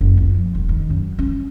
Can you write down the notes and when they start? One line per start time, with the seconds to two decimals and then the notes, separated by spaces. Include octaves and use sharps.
0.01 F#1
0.17 C#2
0.35 F3
0.55 E1
0.69 D#3
0.90 F#2
1.19 C#4